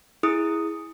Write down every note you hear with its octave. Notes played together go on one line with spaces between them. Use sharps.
E4 G#4 D#6